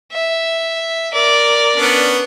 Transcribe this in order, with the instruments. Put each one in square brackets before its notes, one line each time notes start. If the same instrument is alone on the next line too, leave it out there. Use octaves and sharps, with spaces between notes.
[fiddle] E5
A#4 D5
[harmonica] B3 C#4 D4